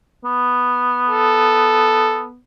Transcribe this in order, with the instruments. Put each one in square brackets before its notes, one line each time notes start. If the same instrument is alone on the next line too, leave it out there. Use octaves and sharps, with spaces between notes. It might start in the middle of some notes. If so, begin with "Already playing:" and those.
[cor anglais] B3
[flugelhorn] A4